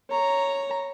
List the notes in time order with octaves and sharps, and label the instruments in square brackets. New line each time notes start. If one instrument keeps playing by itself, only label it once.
[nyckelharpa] C#5 A#5